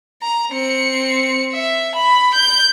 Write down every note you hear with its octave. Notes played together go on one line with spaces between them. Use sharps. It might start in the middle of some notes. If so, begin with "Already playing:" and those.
A#5
C4 C#7
E5
B5
G6